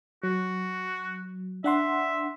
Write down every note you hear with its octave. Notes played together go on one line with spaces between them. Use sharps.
F#3 F#4
D4 E5 F#5 C6